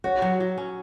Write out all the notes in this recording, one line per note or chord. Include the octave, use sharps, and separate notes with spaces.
F#4 C#5
F#3
F#3
C#4